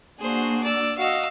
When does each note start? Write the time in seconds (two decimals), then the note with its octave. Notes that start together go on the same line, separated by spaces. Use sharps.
0.20 A#3 D4 F#4 G#4 C5
0.64 D5 E6
0.97 F#4 D#5 F5 E6